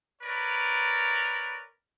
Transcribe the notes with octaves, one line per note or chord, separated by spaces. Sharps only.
A#4 B4 C#5 D5